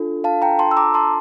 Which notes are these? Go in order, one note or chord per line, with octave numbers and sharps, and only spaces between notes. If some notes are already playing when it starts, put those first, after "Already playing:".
Already playing: D4 F4 A4
F5 A5
G5 A#5
A5 C6
E6
A#5 D6
A5 C6